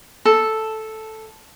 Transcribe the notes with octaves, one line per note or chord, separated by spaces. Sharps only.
A4